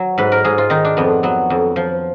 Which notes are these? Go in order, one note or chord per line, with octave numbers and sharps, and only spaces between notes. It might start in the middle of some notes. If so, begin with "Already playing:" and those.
Already playing: F#3
G#2 B4
A#4
G#2 G#4
F4
D#3 D#4
D4
F2 B3
F#3 B3
F2
F3